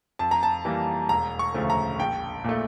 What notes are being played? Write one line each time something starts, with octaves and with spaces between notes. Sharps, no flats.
F2 A5
A#5
A5
E3 G3 A#3
E1 A#5
C#6
D2 C#3 F3 A3
A#5
A#1 G5
A#2 A3